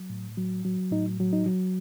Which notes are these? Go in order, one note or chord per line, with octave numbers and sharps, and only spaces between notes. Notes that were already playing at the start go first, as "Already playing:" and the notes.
Already playing: F#3
A2
F#3
F#3
A2 D#4
F#3
D#4
F#3